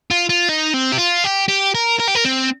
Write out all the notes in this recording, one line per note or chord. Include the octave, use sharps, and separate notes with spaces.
F4
F4
D#4
C4
G4
F4
G4
G4
A#4
A#4
G4
A#4
C4